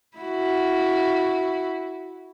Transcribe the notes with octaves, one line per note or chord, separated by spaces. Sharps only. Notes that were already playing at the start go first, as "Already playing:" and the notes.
E4 F#4